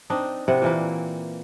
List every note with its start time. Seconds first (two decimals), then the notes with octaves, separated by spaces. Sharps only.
0.10 C4 D4 D#4 D#5
0.48 C3 C4 E4 F#5
0.62 A#2 E3 A#3